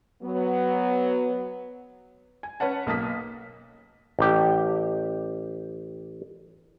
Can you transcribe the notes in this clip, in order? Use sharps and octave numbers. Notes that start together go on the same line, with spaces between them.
F#3 B3
G#5
C#4 B4 C#5 F#5 A5
B1 A#3 A5 D#6 B6
A1 G4